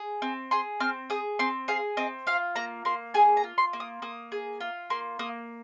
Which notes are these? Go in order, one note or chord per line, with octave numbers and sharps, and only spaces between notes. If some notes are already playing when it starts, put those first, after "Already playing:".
Already playing: G#4
C4
G#4 C6
C4 F6
G#4 D#6
C4 C6
G#4 F5
C4 D#5
F4 F5
A#3 A#5
A#3 C6
G#4 G#5
A#5
F4
C6
A#3
D#6
A#3 D#6
G#4
F4
A#3 C6
A#3 D#6